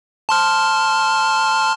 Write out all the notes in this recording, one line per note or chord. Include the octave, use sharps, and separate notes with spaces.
A5 C6 F6